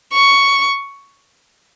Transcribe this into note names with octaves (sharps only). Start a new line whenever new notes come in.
C#6